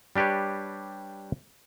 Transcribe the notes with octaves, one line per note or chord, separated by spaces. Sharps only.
G3 D4 G4 B4 C#5